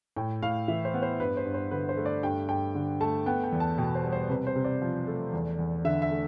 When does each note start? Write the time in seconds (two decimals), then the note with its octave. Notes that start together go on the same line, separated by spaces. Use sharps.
0.16 A2 G5
0.42 A2 F5
0.68 E3 E5
0.85 C5
0.94 B3
1.03 C5
1.20 G2 B4
1.37 C5
1.46 G2
1.54 C5
1.71 D3 B4
1.89 C5
1.97 A3
2.06 D5
2.23 G2 G5
2.49 G2 G5
2.75 D3
3.01 A3 A5
3.26 B3 G5
3.44 G5
3.52 E2
3.60 A5
3.78 B2 G5
3.95 C5
4.04 G3
4.12 C5
4.30 C3 B4
4.47 C5
4.56 C3
4.65 D5
4.82 F3
5.07 A3
5.33 E2
5.59 E2
5.85 D3 E5
6.02 E5
6.11 A3